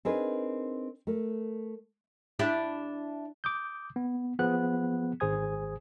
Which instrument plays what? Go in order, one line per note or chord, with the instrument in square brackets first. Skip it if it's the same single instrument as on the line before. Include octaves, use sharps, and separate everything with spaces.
[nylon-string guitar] C4 D4 D#4 G#4 A#4 B4
A3 A#4
[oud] D4 E4 G4
[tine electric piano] D6 D#6 G6
B3
F3 B3 G#4 F#6
G#1 G#4 C5 G#5 D#6 G#6